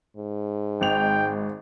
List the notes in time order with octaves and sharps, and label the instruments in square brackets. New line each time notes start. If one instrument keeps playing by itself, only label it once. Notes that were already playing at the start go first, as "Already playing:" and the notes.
[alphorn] G#2
[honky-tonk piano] G#1 F7 [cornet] G5